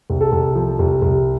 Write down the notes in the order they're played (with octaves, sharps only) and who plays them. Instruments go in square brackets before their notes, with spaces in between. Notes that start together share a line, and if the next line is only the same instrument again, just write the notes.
[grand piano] C2
A4
C2
F3
C2
C2